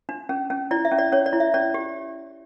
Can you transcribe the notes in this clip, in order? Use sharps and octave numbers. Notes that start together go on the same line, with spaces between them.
D4
C#4
C#4
E4 D5
E5
C#4
D5
C#4 C#5
D5
E4
E5
C#4 D5
G4